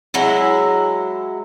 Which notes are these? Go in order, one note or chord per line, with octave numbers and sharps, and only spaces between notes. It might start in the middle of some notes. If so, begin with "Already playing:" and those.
F#3 G#3 E4